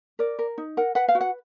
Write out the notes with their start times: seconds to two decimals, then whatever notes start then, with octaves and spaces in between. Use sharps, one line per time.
0.19 A#4 D5
0.39 A#4
0.58 D#4
0.77 A#4 F#5
0.95 B4 F#5
1.08 F5
1.15 F#4
1.21 F#5